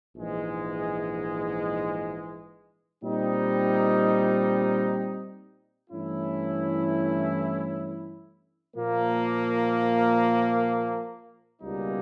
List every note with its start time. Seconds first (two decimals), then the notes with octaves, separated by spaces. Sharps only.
0.16 A#1 G#2 E3 G#3
3.03 A#2 G3 C4 D#4
5.89 G2 E3 A3 C#4 E4
8.75 A#2 F3 A#3
11.62 C#2 B2 G3 A#3 D#4